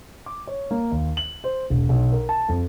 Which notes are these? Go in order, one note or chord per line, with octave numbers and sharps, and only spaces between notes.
D6
C#5
A#3
D#2
F#7
C5
E1
B1
A#4
A5
F2